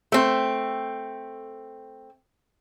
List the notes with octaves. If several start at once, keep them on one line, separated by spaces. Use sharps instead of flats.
A3 C4